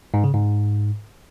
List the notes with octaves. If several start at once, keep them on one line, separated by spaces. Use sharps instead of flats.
G#2
C#3
G#2